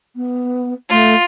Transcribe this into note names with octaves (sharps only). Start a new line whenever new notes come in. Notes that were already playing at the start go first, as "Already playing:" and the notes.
B3
A3 F4